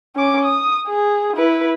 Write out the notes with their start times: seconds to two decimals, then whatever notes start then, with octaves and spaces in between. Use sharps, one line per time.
0.16 C#4 D6
0.45 D#6
0.88 G#4
1.37 E4 B4